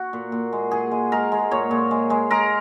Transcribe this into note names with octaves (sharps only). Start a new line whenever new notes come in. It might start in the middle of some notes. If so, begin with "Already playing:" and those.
Already playing: F#4
A#2
A#2
G#3
A#2 G#4
G#3
G#3 A#4
G#3
A#2 C#5
A#2
G#3
G#3
G#3 A#4